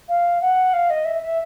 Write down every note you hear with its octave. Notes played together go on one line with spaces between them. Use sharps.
F5
F#5
F5
D#5
E5
E5